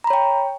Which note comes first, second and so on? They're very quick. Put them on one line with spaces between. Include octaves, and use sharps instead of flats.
A#5 B5 C#5 G5